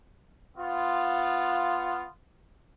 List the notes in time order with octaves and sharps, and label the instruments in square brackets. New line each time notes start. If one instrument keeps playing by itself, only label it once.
[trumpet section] B3 F4